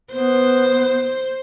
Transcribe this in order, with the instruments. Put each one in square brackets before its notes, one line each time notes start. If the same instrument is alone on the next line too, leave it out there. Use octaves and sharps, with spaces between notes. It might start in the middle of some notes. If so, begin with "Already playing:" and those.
[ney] B3 [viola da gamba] C5